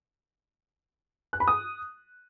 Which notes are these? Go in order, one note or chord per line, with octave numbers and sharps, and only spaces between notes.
F#6
B5
D#6